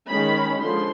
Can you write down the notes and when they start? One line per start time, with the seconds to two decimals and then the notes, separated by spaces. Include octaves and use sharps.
0.08 D#3 G#3 C#4 B5
0.59 D3 F3 G#3 C6